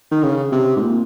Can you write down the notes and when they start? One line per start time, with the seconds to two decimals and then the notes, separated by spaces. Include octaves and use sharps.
0.11 D#3
0.23 C#3
0.52 C3
0.76 G#2
0.81 A#2